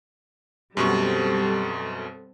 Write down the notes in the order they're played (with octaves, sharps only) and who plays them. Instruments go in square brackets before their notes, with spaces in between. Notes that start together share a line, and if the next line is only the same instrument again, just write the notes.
[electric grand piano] F#2 B2 C#6 [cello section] G3 C4 A4 [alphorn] G4